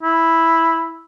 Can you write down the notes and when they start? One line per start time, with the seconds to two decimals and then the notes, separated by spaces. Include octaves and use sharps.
0.03 E4